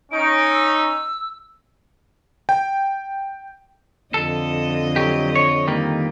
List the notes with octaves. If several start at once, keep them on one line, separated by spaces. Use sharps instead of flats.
C#4 D#4 D7
E6
G5
F2 D3 A4 D#5
F#3 G4
C#5
D#3 G3 A#3